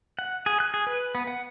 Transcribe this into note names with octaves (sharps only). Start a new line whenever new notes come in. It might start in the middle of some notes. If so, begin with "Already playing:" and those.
F#5
G#4
F#6
G#4
B4
B3
F#5